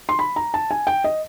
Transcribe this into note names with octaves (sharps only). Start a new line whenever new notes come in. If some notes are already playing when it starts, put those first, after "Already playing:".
C6
B5
A#5
A5
G#5
G5
D#5